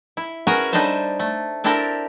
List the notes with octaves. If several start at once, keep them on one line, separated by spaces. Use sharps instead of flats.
E4
C#4 F#4 G#4 A#4 B4 C#5
G3 D4 D#4 A4 C5 E5
A3
C4 D4 E4 G4 A4 A#4